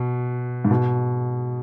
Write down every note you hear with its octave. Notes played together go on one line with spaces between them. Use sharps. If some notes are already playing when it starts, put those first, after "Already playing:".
Already playing: B2
G#2
B2